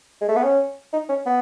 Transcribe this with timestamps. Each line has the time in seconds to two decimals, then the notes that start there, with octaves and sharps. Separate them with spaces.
0.21 G#3
0.29 A3
0.36 B3
0.44 C#4
0.93 D#4
1.09 C#4
1.26 B3